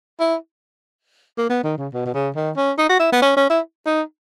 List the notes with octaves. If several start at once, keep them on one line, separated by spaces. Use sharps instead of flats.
E4
A#3
B3
D#3
C#3
B2
B2
C#3
D#3
C#4
D#4
F#4
E4
B3
C#4
C#4
E4
D#4